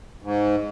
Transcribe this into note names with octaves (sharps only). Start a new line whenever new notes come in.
G#2